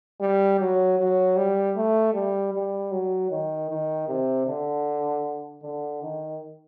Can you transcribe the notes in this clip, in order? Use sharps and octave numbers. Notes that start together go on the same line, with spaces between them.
G3
F#3
F#3
G3
A3
G3
G3
F#3
D#3
D#3
C3
D3
D3
D#3